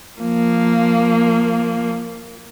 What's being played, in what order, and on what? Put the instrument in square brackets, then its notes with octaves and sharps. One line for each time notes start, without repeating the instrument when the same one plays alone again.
[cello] F3 A#3